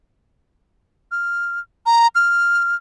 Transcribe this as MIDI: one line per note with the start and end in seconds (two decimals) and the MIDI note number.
1.11 1.60 89
1.86 2.07 82
2.15 2.75 89